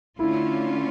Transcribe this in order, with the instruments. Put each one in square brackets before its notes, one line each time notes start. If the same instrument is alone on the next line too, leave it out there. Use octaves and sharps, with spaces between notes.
[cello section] D3 A3 C#4 F4 [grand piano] E4